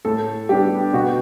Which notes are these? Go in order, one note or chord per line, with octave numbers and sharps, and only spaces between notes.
A2 A4
G3 B3 D4 G4
B2 F#4